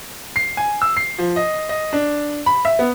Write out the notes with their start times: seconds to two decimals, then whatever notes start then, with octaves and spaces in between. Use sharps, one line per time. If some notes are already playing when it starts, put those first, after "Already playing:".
0.36 C7
0.57 G#5
0.82 E6
0.97 C7
1.18 F3
1.36 D#5
1.69 D#5
1.93 D4
2.46 B5
2.65 E5
2.79 B3